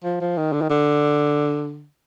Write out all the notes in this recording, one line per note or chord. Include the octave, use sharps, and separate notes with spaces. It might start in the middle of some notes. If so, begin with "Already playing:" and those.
F3
F3
D#3
D3
D#3
D3